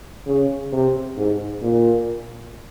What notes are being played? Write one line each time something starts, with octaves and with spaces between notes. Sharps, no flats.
C#3
C3
G#2
A#2